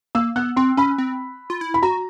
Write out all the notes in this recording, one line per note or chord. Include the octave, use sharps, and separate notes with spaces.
A#3 E6
B3 F#6
C4 C6
C#4 B5
C4
F4
E4
B5
F#4 A#5